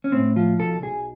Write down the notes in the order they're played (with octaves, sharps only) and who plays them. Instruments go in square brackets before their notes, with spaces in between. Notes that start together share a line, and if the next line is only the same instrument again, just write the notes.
[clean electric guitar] C#4
A2 C4
F3 F4
B1 A4
B1 G#4